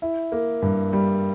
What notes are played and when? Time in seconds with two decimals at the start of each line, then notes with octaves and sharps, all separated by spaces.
0.02 E4
0.32 A#3
0.62 G2
0.93 G3